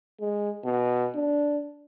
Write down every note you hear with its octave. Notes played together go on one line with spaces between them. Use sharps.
G#3
B2
D4